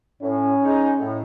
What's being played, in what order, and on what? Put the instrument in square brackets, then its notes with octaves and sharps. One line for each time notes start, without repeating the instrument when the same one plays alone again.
[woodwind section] A2 [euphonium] C#4
[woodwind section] G#3 D#4
A2